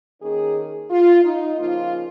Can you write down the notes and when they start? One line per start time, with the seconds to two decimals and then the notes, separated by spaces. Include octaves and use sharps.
0.21 D#3 A#3 C#4 G#4
0.90 F4
1.24 D#4
1.57 C#3 F3 A#3 D#4 F4